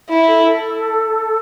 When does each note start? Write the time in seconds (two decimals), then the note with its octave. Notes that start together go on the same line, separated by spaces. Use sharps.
0.09 E4
0.27 A4
0.47 A4